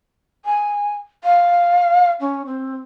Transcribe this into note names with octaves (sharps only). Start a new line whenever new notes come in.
G#5
F5
C#4
C4